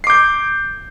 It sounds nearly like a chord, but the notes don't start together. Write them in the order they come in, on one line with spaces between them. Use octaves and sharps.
C7 D6 G6